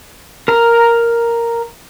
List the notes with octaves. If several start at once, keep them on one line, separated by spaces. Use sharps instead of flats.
A#4 A#5